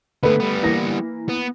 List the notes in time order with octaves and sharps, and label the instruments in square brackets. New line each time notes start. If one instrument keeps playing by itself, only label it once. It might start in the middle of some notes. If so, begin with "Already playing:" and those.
[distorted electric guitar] D3 B3 [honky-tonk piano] A3 B4
[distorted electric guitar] G3 B3
[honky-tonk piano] E3 A#3 A#6
[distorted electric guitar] B3